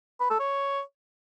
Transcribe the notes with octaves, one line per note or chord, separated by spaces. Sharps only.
B4
A4
C#5